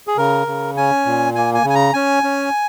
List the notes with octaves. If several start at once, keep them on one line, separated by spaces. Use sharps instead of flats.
G#4
C#3 A#4
C#3
C#4 G#5
A#2
A#3 G#5
G#5
C#3
G#5
A#5
C#4 G#5
C#4